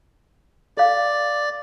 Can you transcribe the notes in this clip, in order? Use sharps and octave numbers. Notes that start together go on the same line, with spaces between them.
A4 D5 F5